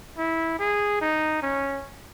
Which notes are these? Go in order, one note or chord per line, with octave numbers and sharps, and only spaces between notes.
E4
G#4
D#4
C#4